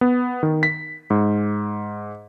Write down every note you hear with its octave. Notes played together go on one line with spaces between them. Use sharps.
B3
D#3
B6
G#2